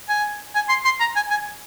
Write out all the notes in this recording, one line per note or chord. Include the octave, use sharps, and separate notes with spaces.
G#5
G#5
C6
C6
A#5
G#5
G#5